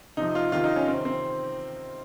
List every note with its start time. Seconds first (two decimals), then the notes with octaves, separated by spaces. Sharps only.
0.17 C3 F3 D#4
0.35 F4
0.52 C3 D#3 F4
0.64 D#4
0.76 C#4
0.88 C3 D#3 C4
1.05 C4